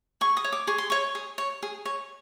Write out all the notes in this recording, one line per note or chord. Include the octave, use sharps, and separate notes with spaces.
G#4 C#6
D#6
C#5
D6
G#4 C#6
C6
C#5 C#6
G#4
C#5
G#4
C#5